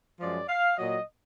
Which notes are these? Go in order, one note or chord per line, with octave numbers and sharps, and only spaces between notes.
F#2 F3 G#3 D5
F5
A#2 F#3 D#5